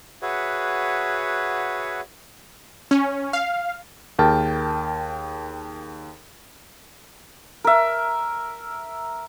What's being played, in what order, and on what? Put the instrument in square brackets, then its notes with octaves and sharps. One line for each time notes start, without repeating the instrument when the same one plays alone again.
[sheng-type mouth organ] F#4 G#4 B4 C#5 E5 F#5
[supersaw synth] C#4
F5
[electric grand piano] D#2 G#4 A#4 G5 A5 F6
[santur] A#4 E5